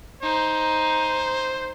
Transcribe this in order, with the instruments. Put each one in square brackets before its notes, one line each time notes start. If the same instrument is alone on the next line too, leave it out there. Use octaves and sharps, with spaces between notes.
[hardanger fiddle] D#4 [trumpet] C5